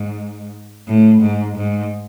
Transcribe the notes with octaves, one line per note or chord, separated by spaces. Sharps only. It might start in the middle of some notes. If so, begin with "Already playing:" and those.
Already playing: G#2
A2
G#2
G#2